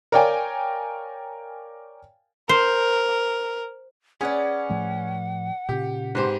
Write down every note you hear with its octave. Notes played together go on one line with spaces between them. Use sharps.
A#4 C#5 D5 F5 G5 G#5
A#4 C5
C#4 G#4 B4 D5 F#5
A2 F3 A3
A#2 C#3 G4
G#2 C4 G4 B4 C5